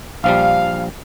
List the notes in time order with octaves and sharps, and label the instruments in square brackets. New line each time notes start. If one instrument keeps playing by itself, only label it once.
[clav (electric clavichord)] A#1 F3 G3 [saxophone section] F5